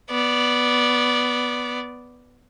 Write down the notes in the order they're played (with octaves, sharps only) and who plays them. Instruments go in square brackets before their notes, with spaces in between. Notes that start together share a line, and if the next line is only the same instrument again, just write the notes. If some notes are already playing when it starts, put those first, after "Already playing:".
[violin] B3 D5